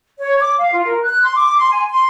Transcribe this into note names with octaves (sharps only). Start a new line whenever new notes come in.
C#5
D6
F5
F4
A#4
F#6
C6
D6
C6
G#5
C6